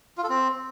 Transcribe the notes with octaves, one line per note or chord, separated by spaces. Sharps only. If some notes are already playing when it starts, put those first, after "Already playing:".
F4
A4
C4